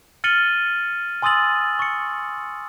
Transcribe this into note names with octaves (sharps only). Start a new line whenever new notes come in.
F6 A6 C#7 D#7 F#7 G7
G#5 C6 D#6 E6 A6 F#7
C#6 C#7